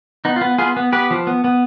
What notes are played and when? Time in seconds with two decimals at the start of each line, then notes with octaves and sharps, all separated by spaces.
0.25 B3 D#4
0.36 F4
0.41 B3
0.58 B3 F4 G#4
0.77 B3
0.92 B3 G4 B4
1.11 F3
1.27 B3
1.44 B3